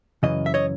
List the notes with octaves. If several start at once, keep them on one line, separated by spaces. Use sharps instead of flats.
F#2 C#3 E3 D#5
E5
C#5 D#5